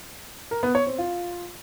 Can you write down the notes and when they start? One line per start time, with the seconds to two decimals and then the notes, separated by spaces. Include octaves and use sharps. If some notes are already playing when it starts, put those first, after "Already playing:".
0.51 A#4
0.63 B3
0.75 C#5
0.87 C4
0.98 F4